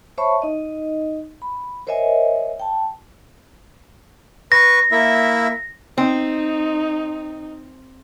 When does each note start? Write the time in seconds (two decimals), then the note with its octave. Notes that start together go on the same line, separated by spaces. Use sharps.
0.18 C5 C#5 E5 A5 B5 C#6
0.42 D#4 D#5
1.42 B5
1.87 A#4 C5 C#5 D#5 E5 G#5
2.60 G5 A5
4.52 B4 C#6 A#6
4.92 A#3 E4 E5
5.98 C4 D#4